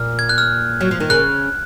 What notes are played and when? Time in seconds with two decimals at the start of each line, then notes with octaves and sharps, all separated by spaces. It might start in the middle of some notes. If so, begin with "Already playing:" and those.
Already playing: A#2 F6
0.19 G#6
0.29 F#6
0.38 F6
0.81 F#3
0.91 F3
1.00 D#3
1.10 C#3 F#6